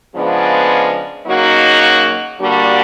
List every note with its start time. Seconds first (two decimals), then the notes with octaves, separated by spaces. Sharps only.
0.14 C#3 F3 G#3 B3 D4
1.27 C#3 F#3 A#3 D#4 F#4
2.40 D3 G3 A#3 D4 F#4